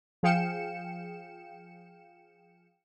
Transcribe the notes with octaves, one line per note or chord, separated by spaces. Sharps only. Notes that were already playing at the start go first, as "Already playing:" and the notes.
F3 G#4 F5 G5 C#7 E7